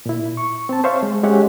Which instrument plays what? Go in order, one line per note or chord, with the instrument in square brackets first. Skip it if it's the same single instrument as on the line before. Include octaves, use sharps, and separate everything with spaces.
[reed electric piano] A#2 E4
C#6
C4 A5
C5 C#5 E5 F5 C#6
G#3
G#3 C#4 G4 C#5 E5 F#5